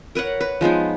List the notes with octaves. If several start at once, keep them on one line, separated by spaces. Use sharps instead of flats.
A#4 B4 C#5 F#5
B4
F3 G#3 B3 D#4